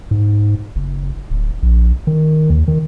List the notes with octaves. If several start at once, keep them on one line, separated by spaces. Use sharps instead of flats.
G#2
F#1
D1
A#1
D#3
D#2
D#3